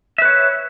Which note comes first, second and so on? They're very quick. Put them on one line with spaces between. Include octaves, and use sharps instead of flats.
E5 B4 C#5